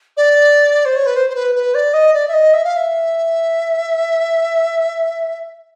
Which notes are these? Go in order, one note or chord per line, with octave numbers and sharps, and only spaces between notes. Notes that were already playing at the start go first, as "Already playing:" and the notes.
D5
C5
C#5
B4
C5
C5
B4
B4
D5
D#5
D5
E5
D#5
E5
F5
E5